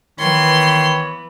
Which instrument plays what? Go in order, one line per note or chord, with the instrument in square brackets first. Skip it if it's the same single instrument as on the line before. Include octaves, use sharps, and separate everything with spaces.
[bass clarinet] D#3 [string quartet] E3 B3 [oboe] C#5 [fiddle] C6